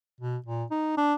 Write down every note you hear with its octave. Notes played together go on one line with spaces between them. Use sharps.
B2
A#2
D#4
D4